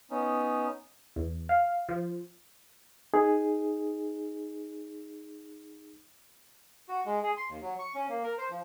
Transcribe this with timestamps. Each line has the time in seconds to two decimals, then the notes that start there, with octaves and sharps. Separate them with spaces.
0.11 B3 C#4 D#4
1.16 E2
1.49 F5
1.89 F3
3.14 D#4 G#4
6.89 F#4
7.06 G#3
7.23 G#4
7.37 C6
7.49 D#2
7.62 F#3
7.79 C#6
7.95 C#4
8.09 A#3
8.24 A#4
8.38 C5
8.50 F3